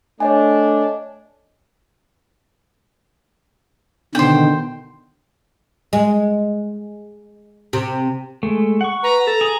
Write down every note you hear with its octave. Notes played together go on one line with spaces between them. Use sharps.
A3 D4 C#5 D#5 G#5
B2 D3 D#3 C5 G5
G#3
C3
G#3 A3
F#5 C#6
B4 A#5
A4
G#4